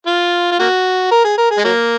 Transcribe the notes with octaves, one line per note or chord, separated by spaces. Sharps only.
F4
F4
A#3 F#4
A#4
G#4
A#4
G#4
G#3
F#3 A#3